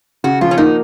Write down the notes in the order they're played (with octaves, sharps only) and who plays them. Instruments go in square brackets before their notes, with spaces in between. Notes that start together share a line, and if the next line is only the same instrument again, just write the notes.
[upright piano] C#3 [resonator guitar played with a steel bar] F#4
[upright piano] F3 [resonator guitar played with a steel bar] F4
[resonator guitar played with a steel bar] C#4
[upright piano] A#3 [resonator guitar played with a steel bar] D#4